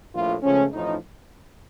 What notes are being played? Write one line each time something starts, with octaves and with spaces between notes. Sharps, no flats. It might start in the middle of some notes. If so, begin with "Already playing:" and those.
A#1 A2 A3 F4
C#2 C#3 F3 A3 C#4
A1 A2 F3 D#4